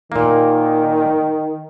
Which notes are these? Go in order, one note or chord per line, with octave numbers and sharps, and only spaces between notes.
A#2 D#3 A#3